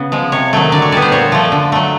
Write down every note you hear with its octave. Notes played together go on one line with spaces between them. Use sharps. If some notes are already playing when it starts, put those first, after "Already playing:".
Already playing: C#3 B3
F3 G#3
C3 C#5
D#3 F#3 A3
D3 D5
C#5
G3 B3 D5
C5
A#2 C#5
F3 A3
D3
F#3 A3